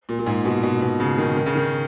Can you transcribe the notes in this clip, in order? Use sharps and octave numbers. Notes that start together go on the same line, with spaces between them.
A#2
A#2
G#2
B2
B2
B2
C#3
D#3
D#3
C#3
D#3